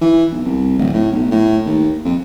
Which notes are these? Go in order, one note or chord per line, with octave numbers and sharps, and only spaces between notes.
E3
B1
C2
D1
A2
B1
A2
D#2
F2